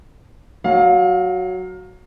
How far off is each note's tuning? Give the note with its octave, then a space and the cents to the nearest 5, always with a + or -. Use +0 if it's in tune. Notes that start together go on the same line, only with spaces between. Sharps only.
F#3 +0 F5 +20